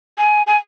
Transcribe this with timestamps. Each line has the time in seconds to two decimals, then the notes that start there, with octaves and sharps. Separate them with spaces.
0.18 G#5
0.47 G#5